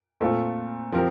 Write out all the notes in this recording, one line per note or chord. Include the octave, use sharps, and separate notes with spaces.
A#2 A3 C4 F4 A4
F3 C4 G4 A#4